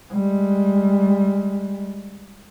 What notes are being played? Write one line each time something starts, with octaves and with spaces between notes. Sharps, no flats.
G3 G#3